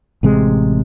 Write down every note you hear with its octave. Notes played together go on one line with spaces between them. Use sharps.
A1 C3 G#3